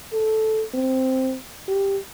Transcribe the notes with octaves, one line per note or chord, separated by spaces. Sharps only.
A4
C4
G4